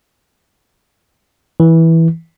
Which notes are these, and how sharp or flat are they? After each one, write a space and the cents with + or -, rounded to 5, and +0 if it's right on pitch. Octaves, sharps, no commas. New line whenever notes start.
E3 -10